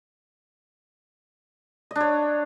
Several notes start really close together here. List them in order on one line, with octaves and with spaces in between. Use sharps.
D#5 D4 C#5